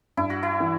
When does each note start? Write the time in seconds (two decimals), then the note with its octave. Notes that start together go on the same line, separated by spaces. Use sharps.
0.17 G2 E4
0.30 F#4
0.43 E4
0.60 E3